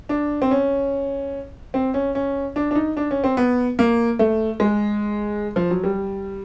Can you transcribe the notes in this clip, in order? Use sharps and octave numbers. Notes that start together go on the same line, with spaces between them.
D4
C4
C#4
C4
C#4
C#4
D4
D4
D#4
D4
C#4
C4
B3
A#3
A3
G#3
F3
F#3
G3